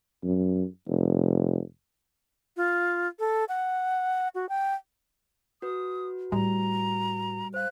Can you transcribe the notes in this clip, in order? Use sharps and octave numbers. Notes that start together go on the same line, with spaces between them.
F#2
F1
F4
A4
F#5
F#4
G5
F#4 B4 D#6
A2 G3 A#5
C5 F5 F#6